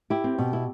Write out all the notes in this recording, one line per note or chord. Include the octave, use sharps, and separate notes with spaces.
E4 G4
C4
B2
E4